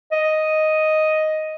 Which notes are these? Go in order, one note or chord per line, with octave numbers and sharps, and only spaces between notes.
D#5